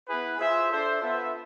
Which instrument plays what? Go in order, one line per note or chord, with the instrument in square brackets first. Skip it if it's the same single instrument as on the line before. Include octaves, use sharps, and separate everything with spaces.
[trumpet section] B3 E4 G#4 B4
F4 G#4 C5 E5
D4 A4 C5 E5
B3 F4 A4 E5